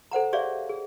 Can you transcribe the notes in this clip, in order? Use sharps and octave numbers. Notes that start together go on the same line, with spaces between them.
A4 C5 F#5 A#5
G4 G#4 C#5 D5 E5 F5
G#4